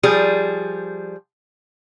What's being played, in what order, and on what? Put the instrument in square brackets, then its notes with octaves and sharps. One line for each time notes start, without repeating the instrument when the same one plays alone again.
[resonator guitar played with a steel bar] F3 G3 G#4